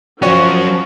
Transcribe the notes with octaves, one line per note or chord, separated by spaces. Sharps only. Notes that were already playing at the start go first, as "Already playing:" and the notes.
F3 F#3 C#4 F#4 C#5